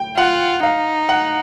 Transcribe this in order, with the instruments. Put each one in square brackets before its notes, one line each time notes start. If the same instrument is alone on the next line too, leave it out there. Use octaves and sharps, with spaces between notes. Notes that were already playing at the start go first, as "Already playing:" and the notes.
Already playing: [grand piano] G5
[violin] F4 [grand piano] F#5
[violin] D#4 [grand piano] F5
[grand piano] F#5